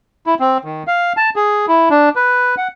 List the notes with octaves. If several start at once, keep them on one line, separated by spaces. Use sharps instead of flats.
E4
C4
D#3
F5
A5
G#4
E4
D4
B4
F#5